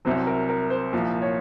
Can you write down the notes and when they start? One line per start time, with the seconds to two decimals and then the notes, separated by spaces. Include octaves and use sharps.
0.05 C2 C3 F#3 C5
0.27 A#4
0.49 A#4
0.70 C5
0.93 C2 A#2 F3
1.22 C#5